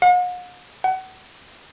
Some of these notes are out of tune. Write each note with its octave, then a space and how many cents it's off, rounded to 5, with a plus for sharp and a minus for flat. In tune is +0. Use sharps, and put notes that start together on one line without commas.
F#5 -45
F#5 +30